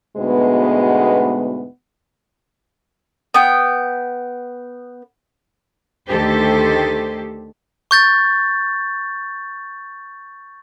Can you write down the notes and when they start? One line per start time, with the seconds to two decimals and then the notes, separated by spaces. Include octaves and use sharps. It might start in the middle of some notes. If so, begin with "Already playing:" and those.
0.17 D2 G#2 B2 G#3 B3
3.34 B3 G5
6.07 D2 D#3 G4 A4 C5
7.91 C#6 G6 A6